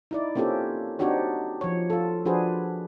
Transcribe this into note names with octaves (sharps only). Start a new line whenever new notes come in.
D#4 E4 D5
A#3 C4 C#4 F4 G4 A4
C4 D4 D#4 F#4 G4 C#5
F3 C#5
F4 A4
F3 D4 F#4 G#4 B4 C5